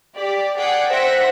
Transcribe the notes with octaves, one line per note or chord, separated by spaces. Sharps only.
G4 D5
G#4 D5 F#5 G5
C5 E5 F#5 G5 A#6